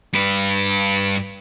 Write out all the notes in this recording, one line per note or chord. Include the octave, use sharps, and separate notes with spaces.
G2 B4